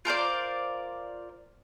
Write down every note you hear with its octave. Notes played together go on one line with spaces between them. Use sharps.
F4 A#4 C5 D5